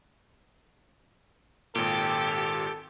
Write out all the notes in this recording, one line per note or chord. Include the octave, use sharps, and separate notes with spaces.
G#1 A#2 G4 A4